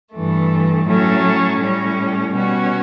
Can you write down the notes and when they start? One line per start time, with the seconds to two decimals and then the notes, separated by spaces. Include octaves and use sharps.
0.13 G2 E3 A3
0.86 A2 F#3 A3 C#4
1.60 A2 G3 C#4
2.34 B2 G3 C#4 F#4